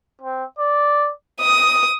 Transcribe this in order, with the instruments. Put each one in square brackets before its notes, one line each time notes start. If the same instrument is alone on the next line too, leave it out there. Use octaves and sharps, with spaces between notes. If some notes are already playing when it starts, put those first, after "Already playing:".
[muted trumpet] C4
D5
[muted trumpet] D#5 [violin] D#6